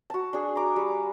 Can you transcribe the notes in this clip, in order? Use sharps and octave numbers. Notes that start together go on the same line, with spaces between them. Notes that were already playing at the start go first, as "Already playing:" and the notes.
F#4 A5
D4 G#4
A#5 D6
G3